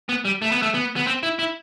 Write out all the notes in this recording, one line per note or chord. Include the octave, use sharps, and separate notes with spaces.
B3
G3
A3
B3
A3
B3
B3
C4
E4
E4